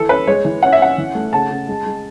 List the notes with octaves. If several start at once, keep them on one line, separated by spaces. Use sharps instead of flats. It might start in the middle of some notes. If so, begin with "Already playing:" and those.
Already playing: E3 A4
C#4 B4
G#3 C#5
E3
C#4 F#5
E5
C#4 F#5
E3
A3
C#3 A5
C#3
G#3
G#3